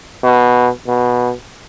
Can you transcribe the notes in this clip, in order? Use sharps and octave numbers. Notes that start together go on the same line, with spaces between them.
B2
B2